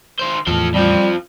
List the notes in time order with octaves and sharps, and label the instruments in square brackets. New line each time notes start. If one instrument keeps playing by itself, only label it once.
[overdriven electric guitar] D#3 C5
[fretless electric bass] E2 A2 [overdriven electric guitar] F3 A4
[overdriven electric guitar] F2 F3 [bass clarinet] G3